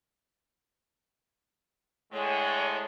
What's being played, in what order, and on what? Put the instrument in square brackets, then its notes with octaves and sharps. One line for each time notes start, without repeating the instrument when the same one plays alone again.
[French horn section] A2 D3 G#3 [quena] C#5